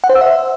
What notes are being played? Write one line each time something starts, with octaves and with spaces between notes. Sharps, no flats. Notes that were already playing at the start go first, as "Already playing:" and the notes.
F#5
C5
E6
E5